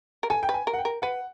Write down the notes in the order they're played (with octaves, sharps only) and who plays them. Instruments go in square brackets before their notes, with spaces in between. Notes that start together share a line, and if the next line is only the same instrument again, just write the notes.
[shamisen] A#4
[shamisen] A4 [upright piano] G#5
[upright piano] G5
[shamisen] B4
[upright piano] G#5
[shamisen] A#4
[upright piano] F#5
G5
[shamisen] A#4
[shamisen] B4 [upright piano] F#5